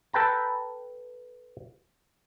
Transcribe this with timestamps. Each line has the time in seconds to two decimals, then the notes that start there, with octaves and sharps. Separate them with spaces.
0.13 A4 B4 G5 A5 A#5